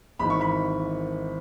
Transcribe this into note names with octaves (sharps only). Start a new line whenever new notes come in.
G#1 G#2 E3 B5
C#6
B5